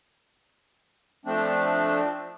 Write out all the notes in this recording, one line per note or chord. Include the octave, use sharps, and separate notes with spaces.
F3 A3 C4 D4